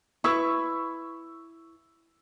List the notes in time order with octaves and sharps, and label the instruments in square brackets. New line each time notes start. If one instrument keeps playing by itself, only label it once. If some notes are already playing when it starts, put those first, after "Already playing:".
[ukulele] E4 B4 [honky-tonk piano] C#6 E6